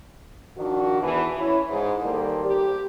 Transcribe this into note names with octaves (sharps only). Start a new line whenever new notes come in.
D#3 F3 D4 F#4
E2 E3
C#4 E4
G#2
D#3 G3 A#3 A4 C5 D5
G4